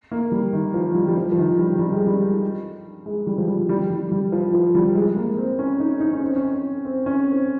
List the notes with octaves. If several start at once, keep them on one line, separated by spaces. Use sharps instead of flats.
A#3
G3
D#3
F3
G3
G3
F3
F3
D#3
G3
G3
G#3
G3
G#3
G3
F3
G3
G3
G3
G3
F3
F3
G3
G#3
A#3
C4
C#4
D#4
D#4
C#4
C4
C#4
C4
C#4
C4